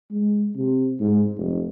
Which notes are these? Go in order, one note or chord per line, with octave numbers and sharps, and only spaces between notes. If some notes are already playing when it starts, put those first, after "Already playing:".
G#3
C3
G#2
F1